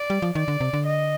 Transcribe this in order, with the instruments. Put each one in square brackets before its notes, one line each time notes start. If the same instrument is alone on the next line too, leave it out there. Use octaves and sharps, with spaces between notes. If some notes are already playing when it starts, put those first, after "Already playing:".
Already playing: [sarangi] D5
[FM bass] G3
F3
[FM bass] D#3 [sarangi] D5
[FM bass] D3
C3
D3
[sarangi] D#5